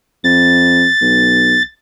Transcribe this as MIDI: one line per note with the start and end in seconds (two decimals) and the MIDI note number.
0.24 0.87 41
0.24 1.63 93
1.01 1.58 35